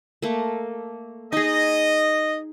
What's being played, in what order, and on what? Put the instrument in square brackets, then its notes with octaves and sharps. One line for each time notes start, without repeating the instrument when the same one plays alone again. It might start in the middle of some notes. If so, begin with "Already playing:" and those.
[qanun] A3 A#3
[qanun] D#4 G#4 [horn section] D#5